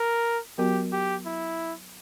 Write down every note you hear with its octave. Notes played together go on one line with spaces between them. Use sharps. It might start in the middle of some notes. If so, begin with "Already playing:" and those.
Already playing: A#4
F#3 B3 F#4 G4 A#4
G4
E4